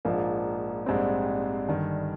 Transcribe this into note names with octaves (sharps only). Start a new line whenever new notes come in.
A#1 G#2 F3 A#3 F4
A#1 G#2 G3 C4
G1 G2 D#3